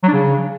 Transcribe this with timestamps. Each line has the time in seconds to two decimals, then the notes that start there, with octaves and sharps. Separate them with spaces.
0.03 F#3
0.08 D4
0.13 C#3